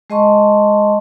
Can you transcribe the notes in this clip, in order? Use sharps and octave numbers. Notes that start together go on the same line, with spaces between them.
G#3 G#4 D#5 A5 C6 C#6